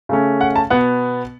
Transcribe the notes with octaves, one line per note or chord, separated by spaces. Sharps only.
C#3 A3 C#4
F#5
A5
B2 B3 F#5